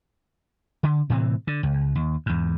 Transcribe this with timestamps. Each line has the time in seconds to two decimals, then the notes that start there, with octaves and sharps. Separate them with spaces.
0.83 D3
1.10 A2 C3 E3 C4
1.47 D3
1.63 C#2
1.95 D#2
2.26 E2 G#2